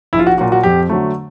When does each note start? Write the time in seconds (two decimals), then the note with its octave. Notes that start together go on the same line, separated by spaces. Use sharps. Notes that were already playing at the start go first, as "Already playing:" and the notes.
0.13 A#1 E4
0.19 F4
0.27 F#4
0.38 A#2 F#3 F#4
0.52 F#4
0.63 F2 G4
0.89 D3 F#3 A3